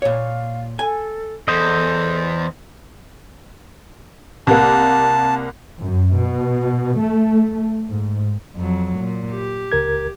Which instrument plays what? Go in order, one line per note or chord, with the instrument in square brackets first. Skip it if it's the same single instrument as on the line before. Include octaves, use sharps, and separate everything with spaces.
[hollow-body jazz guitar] A#2 C#5 [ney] F5
[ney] A4 [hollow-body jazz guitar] G#5
[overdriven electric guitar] E2 [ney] A4 [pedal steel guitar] C5 D#5
[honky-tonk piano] C2 A#3 [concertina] A5
[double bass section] F#2
B2
A3
G#2
[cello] F2 F#3
A#2
G4
[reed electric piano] C#2 A#4 G#6